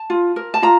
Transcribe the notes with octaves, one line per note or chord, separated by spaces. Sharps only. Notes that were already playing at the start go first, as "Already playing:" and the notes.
Already playing: A5
F4
A#4
A5
F4 A#5